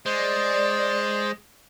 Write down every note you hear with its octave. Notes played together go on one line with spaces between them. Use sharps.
G#3 C5 D5